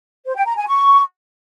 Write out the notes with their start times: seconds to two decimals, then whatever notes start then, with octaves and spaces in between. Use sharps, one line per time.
0.25 C5
0.35 G5
0.46 A#5
0.56 G#5
0.66 C#6